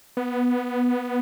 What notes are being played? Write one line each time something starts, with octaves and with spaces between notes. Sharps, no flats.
B3